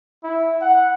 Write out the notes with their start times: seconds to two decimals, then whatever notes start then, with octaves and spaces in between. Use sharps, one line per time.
0.24 E4
0.61 F#5